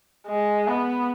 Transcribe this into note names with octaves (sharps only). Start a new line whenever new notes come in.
G#3
B3